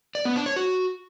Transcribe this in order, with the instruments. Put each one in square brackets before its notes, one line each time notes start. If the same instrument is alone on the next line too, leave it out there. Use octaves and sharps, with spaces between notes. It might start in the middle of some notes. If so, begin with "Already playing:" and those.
[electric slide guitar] D5
B3
D4
C#5
F#4